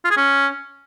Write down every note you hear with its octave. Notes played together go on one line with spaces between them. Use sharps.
F4
G#4
C#4